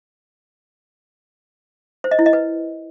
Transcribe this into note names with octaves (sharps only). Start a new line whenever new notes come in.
C5
D#5
E4
D#5
B4